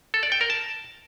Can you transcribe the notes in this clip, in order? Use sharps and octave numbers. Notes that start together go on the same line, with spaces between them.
A4
D5
G5
A#4
A5